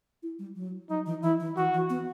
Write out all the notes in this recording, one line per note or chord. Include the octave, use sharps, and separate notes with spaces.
E4
G3
F#3
F#3 D#4
E3
E3 E4
E3
E3 F#4
E3
B3